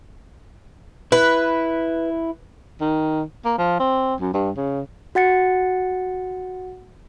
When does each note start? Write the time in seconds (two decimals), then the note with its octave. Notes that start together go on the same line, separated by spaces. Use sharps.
1.12 E4 B4
2.81 D#3
3.45 A#3
3.58 F3
3.80 C4
4.20 F#2
4.34 G2
4.57 C#3
5.15 F#4 F#5 A6 C#7